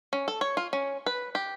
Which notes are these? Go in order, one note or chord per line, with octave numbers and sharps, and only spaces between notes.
C#4
A4
C#5
F4
C#4
B4
G4